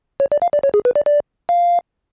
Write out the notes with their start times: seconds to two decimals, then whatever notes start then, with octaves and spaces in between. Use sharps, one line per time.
0.20 C#5
0.32 D5
0.42 F5
0.53 D5
0.63 C#5
0.74 G#4
0.85 B4
0.96 D5
1.06 D5
1.49 F5